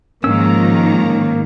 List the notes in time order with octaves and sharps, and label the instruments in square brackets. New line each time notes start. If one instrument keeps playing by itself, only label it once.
[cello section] G#2 D#3 [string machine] F3 A#5 [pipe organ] A#3 [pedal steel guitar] C#4 E6